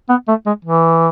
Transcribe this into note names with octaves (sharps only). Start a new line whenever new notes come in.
B3
A3
G#3
E3